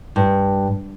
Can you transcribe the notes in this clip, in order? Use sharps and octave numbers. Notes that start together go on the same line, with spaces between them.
G2